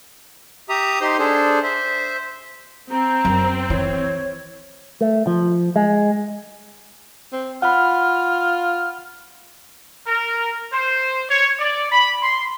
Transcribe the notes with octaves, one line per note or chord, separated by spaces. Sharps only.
G4 E5 A#5 D#6
D#4 G4 C5 C6
D4 G#4 A4 C5
C5 E5
C4 A#5
F#2
E3 C#5
A3
F3
G#3
C4
F4 F#5 B5 F6
A#4
C5
C#5
D5
B5
C6